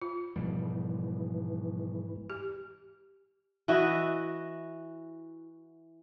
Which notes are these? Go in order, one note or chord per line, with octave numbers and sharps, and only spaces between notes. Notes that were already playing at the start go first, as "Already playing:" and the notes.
F4
G#2 B2 E3 F3 G3
G4
E3 E4 F#4 D#5